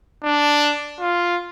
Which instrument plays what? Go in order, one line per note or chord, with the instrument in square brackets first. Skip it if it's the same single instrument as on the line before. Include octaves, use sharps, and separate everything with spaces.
[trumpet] D4
F4